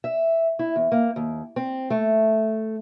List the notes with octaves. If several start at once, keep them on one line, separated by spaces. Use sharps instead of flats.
E5
E4
E2
A#3
D#2
C4
A3